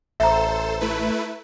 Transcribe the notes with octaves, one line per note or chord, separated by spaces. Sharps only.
A1 A4 C5 E5 A#5 E7
A3 E4 B4